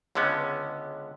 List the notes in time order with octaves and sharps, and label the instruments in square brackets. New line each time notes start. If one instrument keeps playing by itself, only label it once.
[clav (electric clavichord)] C#2 D3 G#3 B3 C#4